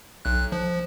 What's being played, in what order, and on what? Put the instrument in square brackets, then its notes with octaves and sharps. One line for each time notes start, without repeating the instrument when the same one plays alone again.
[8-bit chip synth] B1 F#6
F3